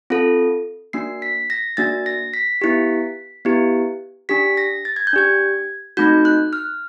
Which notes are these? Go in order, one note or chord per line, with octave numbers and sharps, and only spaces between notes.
C4 F4 A4
A#3 D4 F#4 C7
B6
A#6
A#3 D4 F#4 A6
A#6
B6
B3 E4 G4
B3 E4 G4
D4 G4 B6
A#6
A6
G#6
G6
D4 G4 G#6
A3 C4 D#4 F#4 G6
F#6
F6